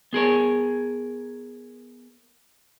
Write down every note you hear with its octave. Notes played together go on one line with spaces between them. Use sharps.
B3 G#4 A#4 C#5